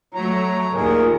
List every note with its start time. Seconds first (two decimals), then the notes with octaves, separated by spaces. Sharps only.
0.14 F#3 A3 C#5 A#5
0.73 D#2 A#2 G#4 A#4